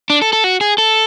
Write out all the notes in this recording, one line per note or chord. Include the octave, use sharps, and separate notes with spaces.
D4
A4
A4
F#4
G#4
A4